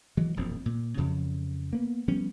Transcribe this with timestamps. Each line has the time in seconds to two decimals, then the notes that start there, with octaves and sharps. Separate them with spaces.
0.17 E3 F#3 G#3
0.37 E1 A#1 F#2 C4
0.66 A#2
0.97 F2 C#3 F3 F#3
1.73 A#3 B3
2.08 F3 G3 B3 C#4